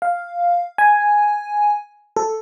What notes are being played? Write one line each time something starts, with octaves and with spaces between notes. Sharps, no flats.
F5
G#5
A4